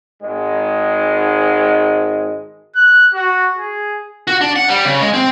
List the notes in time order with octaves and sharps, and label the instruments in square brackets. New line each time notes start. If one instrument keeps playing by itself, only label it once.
[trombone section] G#1 G#2 G#3
[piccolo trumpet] F#6
F#4
G#4
[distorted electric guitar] F#4
D4
F#5
G3
C#3
G#3
C4